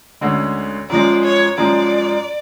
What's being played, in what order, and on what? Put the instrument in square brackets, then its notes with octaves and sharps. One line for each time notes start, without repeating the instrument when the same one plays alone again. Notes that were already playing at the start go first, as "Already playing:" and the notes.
[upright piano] D2 D3 G#3 C#4
[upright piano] F#2 F3 G#3 [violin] D5
[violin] C#5
[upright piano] F#2 F3 G#3 [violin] D5